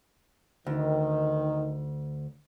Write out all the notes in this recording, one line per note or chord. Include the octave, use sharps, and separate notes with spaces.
D2 D#3